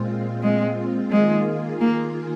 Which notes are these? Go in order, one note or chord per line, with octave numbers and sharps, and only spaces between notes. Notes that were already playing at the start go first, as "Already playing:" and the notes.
Already playing: A#2 G#3 C4 F4
G#3
D#3 G#3 A#3 F4 G#4
A#3